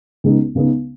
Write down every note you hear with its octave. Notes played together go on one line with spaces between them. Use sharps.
C#2 C#3 G#3 B3 D#4
C#2 C#3 G#3 B3 D#4